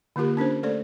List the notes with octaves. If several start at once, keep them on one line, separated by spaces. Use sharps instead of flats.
D3 A#3 F4 G4 A#4
C#4 D4 A#4 C5
A3 A4 C5 D5